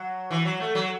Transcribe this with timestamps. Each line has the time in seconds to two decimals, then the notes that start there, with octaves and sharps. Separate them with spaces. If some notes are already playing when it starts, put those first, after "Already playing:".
Already playing: F#3
0.31 E3
0.45 F#3
0.60 A3
0.75 F#3